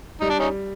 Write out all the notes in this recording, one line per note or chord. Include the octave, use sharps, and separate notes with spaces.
G3 D#4
D4
C#4 D#4